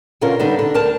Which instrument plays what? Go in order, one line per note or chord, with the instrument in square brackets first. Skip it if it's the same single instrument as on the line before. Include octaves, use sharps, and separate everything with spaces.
[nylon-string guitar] B2 D3 C#4 F4 A#4
D3 G3 B3 D#4
D3
D2 A#4 C5 A5